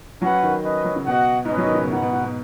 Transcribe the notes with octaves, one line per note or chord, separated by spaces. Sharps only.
F#3 C#4 B4 F#5
D#3
C#4 B4 D#5
F#3
C#3
B2 F#4 D#5 F#5
G#2
B2 C#4 B4 D#5
F#3
D#3
C#3
B2
G#2 F#4 B4 F#5
B2
G#2
B2